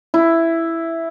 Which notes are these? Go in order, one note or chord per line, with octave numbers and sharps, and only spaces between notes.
E4